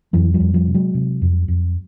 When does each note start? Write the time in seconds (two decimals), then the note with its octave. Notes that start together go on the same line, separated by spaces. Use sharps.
0.13 F2 E3 F#3
0.34 F3 G3
0.40 F2
0.54 F3 G3
0.67 C3
0.74 F#3 G#3
0.94 C3
1.22 F2
1.48 F2